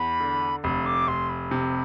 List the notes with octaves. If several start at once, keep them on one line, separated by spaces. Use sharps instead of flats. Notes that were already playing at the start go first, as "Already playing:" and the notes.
Already playing: E2 B5
D3
F1 B5
D6
F1 C6
B5
C3